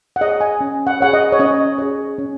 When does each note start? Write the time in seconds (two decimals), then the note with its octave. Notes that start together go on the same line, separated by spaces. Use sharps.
0.16 F#5
0.21 G#4 D#5
0.24 C#5
0.41 G#5
0.61 C#4
0.87 F#5
1.00 G#4 C#5 F#5
1.13 D#5
1.32 C#5
1.39 C#4 D#5
1.78 G#4 C#5
2.18 C#4